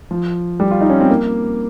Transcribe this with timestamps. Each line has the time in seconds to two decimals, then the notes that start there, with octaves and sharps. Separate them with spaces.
0.11 F3
0.60 G3
0.71 F4
0.81 D#4
0.90 C#4
1.00 C4
1.10 A#3